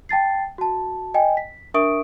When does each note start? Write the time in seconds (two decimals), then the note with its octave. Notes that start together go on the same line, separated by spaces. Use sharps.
0.09 G5 A5 A6 C7
0.58 F#4 A5
1.14 D#5 G5 G#5
1.37 B6
1.74 D4 A#4 E5 C#6 D#6 D7